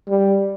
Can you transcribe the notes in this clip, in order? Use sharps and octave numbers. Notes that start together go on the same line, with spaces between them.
G3